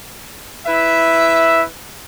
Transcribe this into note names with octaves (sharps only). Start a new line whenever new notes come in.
E4 B4 E5